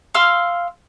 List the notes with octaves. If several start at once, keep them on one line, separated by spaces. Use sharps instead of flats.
F5 C6 E6 F6